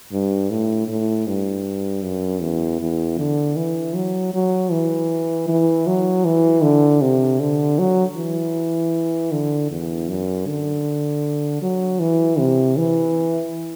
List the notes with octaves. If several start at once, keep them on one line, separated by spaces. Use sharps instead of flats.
G2
A2
A2
G2
F#2
E2
E2
D3
E3
F#3
F#3
E3
E3
F#3
E3
D3
C3
D3
F#3
E3
D3
E2
F#2
D3
F#3
E3
C3
E3